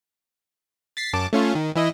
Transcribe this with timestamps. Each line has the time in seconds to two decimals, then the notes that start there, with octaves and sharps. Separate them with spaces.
0.97 A6 B6 C7
1.13 F#2 A5 D6
1.33 A3 C#4 F4
1.55 D#3
1.76 E3 E4 D#5